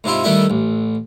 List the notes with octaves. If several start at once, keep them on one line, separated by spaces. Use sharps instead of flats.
G#2 C3 E4 F4
D#3 G3 A3 D4 E4
A1